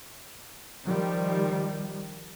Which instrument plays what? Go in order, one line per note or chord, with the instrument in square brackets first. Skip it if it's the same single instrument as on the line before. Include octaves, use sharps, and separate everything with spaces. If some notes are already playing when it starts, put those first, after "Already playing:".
[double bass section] D#3 F3 G3